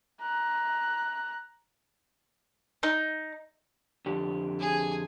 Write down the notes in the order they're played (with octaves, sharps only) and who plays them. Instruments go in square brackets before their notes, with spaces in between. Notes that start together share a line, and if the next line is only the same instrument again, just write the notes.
[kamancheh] A#5 F#6
[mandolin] D#4
[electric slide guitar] F2 D3 G4
[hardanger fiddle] G#4 G#5